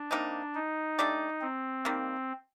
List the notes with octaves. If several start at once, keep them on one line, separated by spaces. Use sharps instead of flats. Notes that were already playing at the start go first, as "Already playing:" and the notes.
Already playing: D4
C3 G3 A#3 D#4
D#4
A3 D4 G4 D5
C4
D#3 G3 A#3